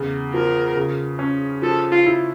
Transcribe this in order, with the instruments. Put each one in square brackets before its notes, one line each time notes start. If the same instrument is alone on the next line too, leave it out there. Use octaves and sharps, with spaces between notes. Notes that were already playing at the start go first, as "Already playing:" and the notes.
Already playing: [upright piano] E2 C#3
[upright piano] F3 [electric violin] A#4
[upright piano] C#3
C#4
[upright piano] F3 [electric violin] A4
[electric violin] F4
[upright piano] E4